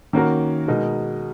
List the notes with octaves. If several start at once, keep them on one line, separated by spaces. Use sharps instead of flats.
D#3 A#3 C#4 F#4 A#4
B2 G#3 D#4 A#4